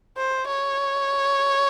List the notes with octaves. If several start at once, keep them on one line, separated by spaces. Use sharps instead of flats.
C5
C#5